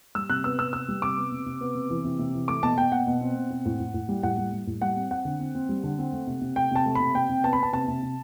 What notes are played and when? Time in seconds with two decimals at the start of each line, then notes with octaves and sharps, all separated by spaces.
0.15 G3 E6
0.29 C3 F#6
0.44 B3 E6
0.58 C3 E6
0.73 B3 E6
0.88 G3
1.02 C3 D6
1.17 B3
1.32 C3
1.46 C3
1.61 B3
1.75 C3
1.90 E3
2.04 C3
2.19 C3
2.34 E3
2.48 A3 D6
2.63 B2 A5
2.78 B2 G5
2.92 B2 F#5
3.07 B2
3.21 C4
3.36 B2
3.50 C4
3.65 A2
3.80 A2
3.94 A2
4.09 G3
4.23 A2 F#5
4.38 G3
4.52 G3
4.67 A2
4.82 G3 F#5
4.96 C4
5.11 C4 F#5
5.25 D3
5.40 C4
5.55 C4
5.69 G3
5.83 D3
5.98 C4
6.12 A3
6.27 C3
6.42 C3
6.56 A3 G5
6.71 C3 A5
6.86 A3
6.95 C3 B5
7.14 C3 G5
7.29 C3
7.44 B3 A5
7.53 B5
7.59 B3 A5
7.73 C3 A5
7.88 C3
8.02 C3